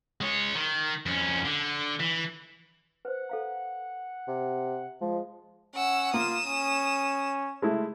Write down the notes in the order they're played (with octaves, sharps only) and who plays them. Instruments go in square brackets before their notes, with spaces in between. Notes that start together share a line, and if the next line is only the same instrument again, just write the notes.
[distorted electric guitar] G#3 C#5
D#3
F2 C#4
D3
E3
[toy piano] B4 C5 [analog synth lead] F#5
[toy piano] A4 F5 A#5
[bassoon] C3
[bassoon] F3 [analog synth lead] G#3
[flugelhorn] C#4 [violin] F#5 E6
[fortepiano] A#3 [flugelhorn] F4 [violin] D#6 E7
[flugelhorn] C#4
[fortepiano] G#3 A3 E4